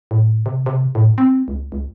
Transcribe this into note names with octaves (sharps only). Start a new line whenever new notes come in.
A2
C3
C3
A2
C4
C#2
C#2